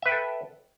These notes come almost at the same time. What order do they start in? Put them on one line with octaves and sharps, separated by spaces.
E5 B4 G5 A4